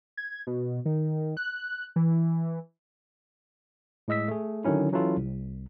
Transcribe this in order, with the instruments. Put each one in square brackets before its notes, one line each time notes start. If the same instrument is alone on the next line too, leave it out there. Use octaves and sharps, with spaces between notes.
[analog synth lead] G#6
B2
D#3
F#6
E3
[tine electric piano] A2 G#3 D#5 E6 B6
A3 G#4
D3 D#3 F#3 C#4 E4
E3 F#3 C#4 E4 F4 A4
C2